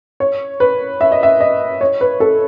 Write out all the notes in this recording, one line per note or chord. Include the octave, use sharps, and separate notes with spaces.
C#5
B4
E5
D#5
E5
D#5
C#5
B4
A4